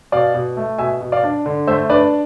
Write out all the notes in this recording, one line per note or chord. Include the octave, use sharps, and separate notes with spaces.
B2 D5 F5
B2
A3
B2 E5 G#5
B2
D5 F5
D4
D3
A3 C5 E5
D4 B4 D5